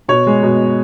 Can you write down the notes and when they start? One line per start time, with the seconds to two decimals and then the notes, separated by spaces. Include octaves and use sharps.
0.08 B2 C#5
0.27 G#3
0.43 B2